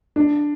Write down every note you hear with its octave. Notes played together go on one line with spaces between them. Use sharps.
D4